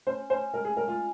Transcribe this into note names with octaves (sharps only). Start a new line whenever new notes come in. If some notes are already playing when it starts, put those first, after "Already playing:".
C#4 C5
C#4 C5
G#3 A#4
G#4
G#3 A#4
F4